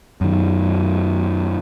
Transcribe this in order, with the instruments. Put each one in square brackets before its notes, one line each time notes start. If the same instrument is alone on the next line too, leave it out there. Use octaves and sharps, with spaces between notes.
[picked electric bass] F#2 D#3